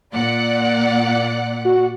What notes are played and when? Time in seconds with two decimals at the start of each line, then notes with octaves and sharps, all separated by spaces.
0.14 A#2 D5 F#5
1.65 F#4